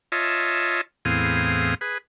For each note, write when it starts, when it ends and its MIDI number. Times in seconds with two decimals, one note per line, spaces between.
0.12 0.81 65
0.12 0.81 73
0.12 0.81 75
0.12 0.81 76
0.12 0.81 81
1.05 1.74 40
1.05 1.74 45
1.05 1.74 60
1.05 1.74 68
1.05 1.74 77
1.05 1.74 87
1.81 1.98 68
1.81 1.98 71